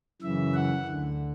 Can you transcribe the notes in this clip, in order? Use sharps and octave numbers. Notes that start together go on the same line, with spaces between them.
F#2 C#3 E3 E5
F#5
D2 D3